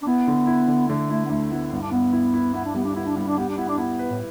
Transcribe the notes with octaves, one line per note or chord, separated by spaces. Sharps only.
D4
B3 E4
D3
E4
D3
D3 A3
A3 E4
B3
D2 A3
B3 E4
G2 B3
D4
G2 B3
E4
E4
B3 E4
D4
G3 B3
D4
B3 E4
D4
G2 B3
D4
G3 B3
D4
B3 E4
D4
B3 E4
B4
A2